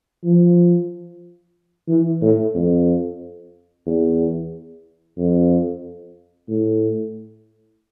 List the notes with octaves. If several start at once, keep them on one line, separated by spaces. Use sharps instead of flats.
F3
E3
A2
F2
E2
F2
A2